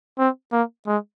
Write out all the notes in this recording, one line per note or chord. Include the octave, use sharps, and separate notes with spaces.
C4
A#3
G#3